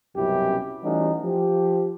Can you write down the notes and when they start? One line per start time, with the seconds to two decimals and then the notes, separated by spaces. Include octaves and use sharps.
0.16 C2 F#2 B2 C#4 E4 G4
0.83 E3 G3 A3 C#4 D#4 F#4
1.24 F3 G4